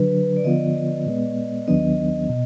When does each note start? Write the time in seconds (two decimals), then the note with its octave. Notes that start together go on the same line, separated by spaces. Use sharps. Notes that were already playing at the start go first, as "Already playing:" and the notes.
Already playing: D3 F#3 D4 B4
0.37 D5
0.44 D3 F3 B3 F4 D#5
1.06 A#2 G#3 B3
1.68 D#2 D#3 F#3 B3 D4 D#5
2.29 B2